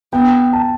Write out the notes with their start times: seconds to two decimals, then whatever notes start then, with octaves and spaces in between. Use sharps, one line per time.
0.13 B3 G5
0.53 A5